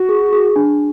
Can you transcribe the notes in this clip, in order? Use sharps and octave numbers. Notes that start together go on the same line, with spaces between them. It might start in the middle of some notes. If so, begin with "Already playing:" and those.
Already playing: F#4
G#4
G#4
D4